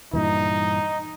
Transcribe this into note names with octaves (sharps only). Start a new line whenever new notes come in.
G2 A#2 E3 D#4